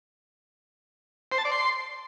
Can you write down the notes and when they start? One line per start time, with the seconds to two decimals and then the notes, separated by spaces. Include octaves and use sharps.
1.32 C5
1.38 A5
1.45 D5
1.52 C6